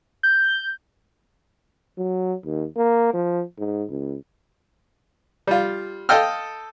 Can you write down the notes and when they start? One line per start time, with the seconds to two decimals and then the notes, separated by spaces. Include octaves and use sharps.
0.23 G6
1.98 F#3
2.45 D#2
2.77 A#3
3.14 F3
3.58 G#2
3.90 C#2
5.47 G3 F4
6.09 A4 D#5 F5 G5 E6 F6